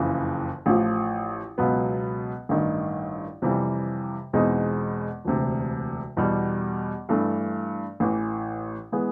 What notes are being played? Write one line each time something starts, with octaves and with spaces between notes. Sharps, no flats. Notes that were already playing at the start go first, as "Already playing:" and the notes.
Already playing: F#1 F2 C#3 E3
A1 A2 F3
C#2 B2 F#3 B3
A1 G2 D#3
F2 C3 E3 G3
E2 B2 G#3 C4 D#4
E1 D2 C3
E2 B2 G3
G2 E3 A3
A1 A2 E3
E3 G#3 B3